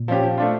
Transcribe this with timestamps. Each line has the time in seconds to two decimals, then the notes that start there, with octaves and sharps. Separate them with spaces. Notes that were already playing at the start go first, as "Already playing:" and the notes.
Already playing: A#2
0.08 F3 C#4 G4
0.23 F3
0.38 A3 D4 F4